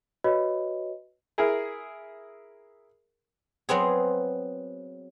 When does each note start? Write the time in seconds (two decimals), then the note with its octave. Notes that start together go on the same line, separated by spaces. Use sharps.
0.24 F#4 B4 C#5 D#5
1.38 E4 G#4 A#4
3.69 F#3 B3 C4 G#4